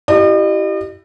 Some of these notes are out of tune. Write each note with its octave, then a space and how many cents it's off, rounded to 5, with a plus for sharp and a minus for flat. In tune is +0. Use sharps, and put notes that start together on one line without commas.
E4 +10 G4 -20 D#5 -45